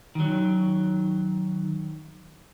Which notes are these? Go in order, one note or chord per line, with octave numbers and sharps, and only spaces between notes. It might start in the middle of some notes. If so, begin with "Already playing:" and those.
D#3 F#3